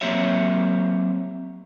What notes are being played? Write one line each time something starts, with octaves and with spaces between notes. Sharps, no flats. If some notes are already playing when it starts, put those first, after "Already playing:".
F#3 A#3 C4 G4 C#5 E5